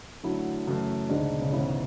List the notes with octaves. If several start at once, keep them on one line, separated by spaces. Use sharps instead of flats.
D3 F#3 A3 E4
F#2 C#3 E3 A3
D2 G#2 D3 G#3 D4
C#3
B2
C#3
G#2 C#3 E3 B3 E4